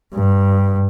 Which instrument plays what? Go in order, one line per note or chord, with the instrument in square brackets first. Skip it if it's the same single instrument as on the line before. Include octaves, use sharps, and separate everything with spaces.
[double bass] G2